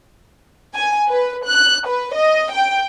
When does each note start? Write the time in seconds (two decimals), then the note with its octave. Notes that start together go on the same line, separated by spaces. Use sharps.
0.75 G#5
1.08 B4
1.46 F#6
1.88 B4
2.16 D#5
2.52 G5